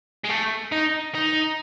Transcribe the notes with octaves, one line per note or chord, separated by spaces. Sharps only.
G#3
A3
D#4
D#4